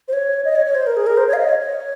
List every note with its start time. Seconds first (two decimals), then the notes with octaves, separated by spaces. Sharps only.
0.08 C5
0.13 C#5
0.45 D#5
0.55 C#5
0.66 C#5
0.75 C5
0.87 A#4
0.96 G#4
1.07 A#4
1.17 C5
1.28 C#5
1.33 F5
1.38 D#5
1.49 C#5
1.59 C#5